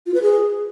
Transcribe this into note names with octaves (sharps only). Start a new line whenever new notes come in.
F4
B4
G#4